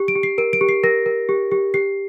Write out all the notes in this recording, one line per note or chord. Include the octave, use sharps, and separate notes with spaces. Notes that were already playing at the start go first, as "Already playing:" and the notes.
Already playing: G4
D7
G4
C7
A#4 D7
D7
G4
C7
A#4 A#6
A#4
G4
G4
G4 C7